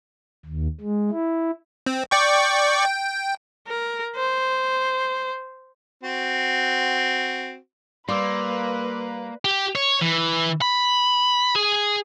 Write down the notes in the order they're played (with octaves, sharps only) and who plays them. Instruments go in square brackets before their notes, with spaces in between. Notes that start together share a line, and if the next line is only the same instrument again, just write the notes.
[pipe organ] D#2
G#3
E4
[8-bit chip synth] C4
D5 G5 C#6
G5
[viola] A#4
C5
[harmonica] C4 F#4
[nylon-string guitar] G3 [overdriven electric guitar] A#3 [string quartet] B4 [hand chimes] C6 D6 E6
[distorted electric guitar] G4
C#5
E3
B5
G#4